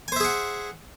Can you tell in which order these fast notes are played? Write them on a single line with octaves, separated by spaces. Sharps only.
G#5 C5 E5 G#4 F#5